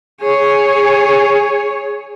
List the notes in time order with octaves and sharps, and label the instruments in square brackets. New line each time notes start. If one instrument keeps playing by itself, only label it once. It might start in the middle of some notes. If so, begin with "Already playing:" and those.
[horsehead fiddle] G#4 C#5